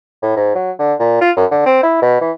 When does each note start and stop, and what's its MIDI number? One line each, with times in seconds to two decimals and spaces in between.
0.22 0.34 45
0.37 0.52 44
0.55 0.71 54
0.79 0.94 50
0.99 1.21 46
1.21 1.31 65
1.37 1.45 42
1.51 1.65 50
1.66 1.82 60
1.83 2.00 64
2.02 2.17 47
2.21 2.32 52